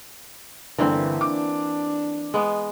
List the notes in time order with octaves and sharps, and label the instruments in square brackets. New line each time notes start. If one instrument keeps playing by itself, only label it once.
[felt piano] G1 D3 [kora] E3 A#3 C4
[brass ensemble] D4 [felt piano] D6
[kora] G#3 B3